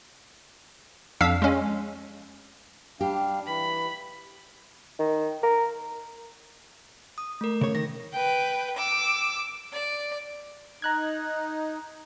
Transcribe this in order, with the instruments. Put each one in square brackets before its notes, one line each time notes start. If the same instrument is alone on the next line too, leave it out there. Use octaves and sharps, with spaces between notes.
[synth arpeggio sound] F2 D4 F5 E6 B6
G#3 C#4
[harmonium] G3 D4 F5 [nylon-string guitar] G4
[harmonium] E3 [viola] B5
[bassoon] D#3
A#4
[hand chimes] D#6
A3 A#4
[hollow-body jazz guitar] C#3 C#5
[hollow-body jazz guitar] D#3 [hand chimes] A#6
[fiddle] B4 G5
D6 E6
D5
[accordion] D#4 [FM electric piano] A#5 F#6 G#6